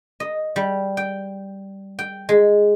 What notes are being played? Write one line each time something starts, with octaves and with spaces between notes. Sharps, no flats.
D#5
G3
G5
G5
G#3